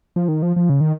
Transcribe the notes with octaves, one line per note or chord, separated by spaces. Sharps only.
F3
D#3
F3
F3
C#3
D#3